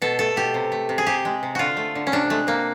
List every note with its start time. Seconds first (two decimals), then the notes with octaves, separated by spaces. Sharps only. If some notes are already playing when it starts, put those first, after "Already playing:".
0.02 B2 A4
0.19 A3 A4
0.36 B2 G4
0.54 C3
0.72 A3
0.89 C3
0.98 G#4
1.07 C3 G4
1.25 G#3
1.43 C3
1.55 D3 F4 F#4
1.77 A3
1.95 D3
2.07 C#4
2.12 C3 D4
2.30 G#3 A3
2.47 C3 A#3